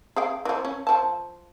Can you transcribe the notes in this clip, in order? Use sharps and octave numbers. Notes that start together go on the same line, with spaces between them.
G#4 F5 G5
E3 F3
C#4
F3 A5